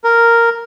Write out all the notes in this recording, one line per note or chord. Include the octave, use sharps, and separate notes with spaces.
A#4